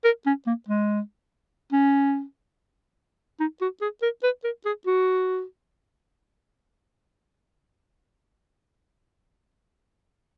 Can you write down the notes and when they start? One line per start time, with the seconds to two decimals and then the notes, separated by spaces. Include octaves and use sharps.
0.04 A#4
0.26 C#4
0.47 A#3
0.68 G#3
1.72 C#4
3.40 D#4
3.61 F#4
3.81 G#4
4.02 A#4
4.23 B4
4.44 A#4
4.65 G#4
4.86 F#4